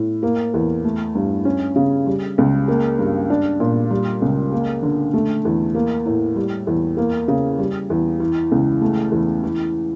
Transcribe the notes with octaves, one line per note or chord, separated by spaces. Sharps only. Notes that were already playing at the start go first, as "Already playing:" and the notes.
Already playing: A2
A#3
E2
A3
G2
C#4
C#3
G3
C#2
A#3
G2
D4
A#2
G3
C#2
A#3
D3
A3
E2
A#3
A2
G3
E2
A#3
C#3
G3
E2
E3
C#2
A3
E2
E3